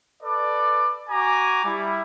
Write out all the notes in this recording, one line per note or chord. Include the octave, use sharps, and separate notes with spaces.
A4 B4 D5
F#4 G#5 A#5 D6
G3 E4